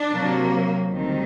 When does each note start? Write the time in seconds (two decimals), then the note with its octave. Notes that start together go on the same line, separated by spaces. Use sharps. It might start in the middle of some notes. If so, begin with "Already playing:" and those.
Already playing: D4
0.12 C3 F#3 A#3
0.90 D2 C3 D#3 G3 C4